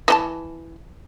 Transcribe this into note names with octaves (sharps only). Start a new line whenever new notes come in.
E3 D#4 A5